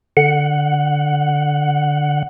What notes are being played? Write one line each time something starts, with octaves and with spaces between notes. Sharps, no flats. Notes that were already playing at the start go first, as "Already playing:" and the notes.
D3 F#5